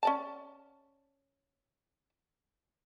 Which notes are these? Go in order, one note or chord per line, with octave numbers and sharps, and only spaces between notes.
C#4 D5 A5